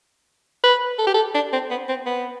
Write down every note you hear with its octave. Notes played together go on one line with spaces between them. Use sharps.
B4
A4
G4
A4
D4
C4
B3
C4
B3